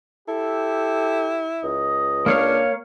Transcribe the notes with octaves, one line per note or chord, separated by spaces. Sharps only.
E4 G4 A4
C#2 D#5
A#3 D4 C#5 F5